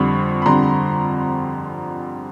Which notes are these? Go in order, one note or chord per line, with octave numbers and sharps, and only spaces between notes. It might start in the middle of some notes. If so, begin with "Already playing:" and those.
Already playing: F2 D3 G3 B5 C#6
B5
F2 D3 G3 A#5 C6